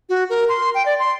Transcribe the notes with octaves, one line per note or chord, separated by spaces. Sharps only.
F#4
A#4
C6
G5
D5
C6